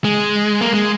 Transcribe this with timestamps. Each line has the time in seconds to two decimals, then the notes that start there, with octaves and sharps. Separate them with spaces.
0.04 G#3
0.61 A#3
0.73 G#3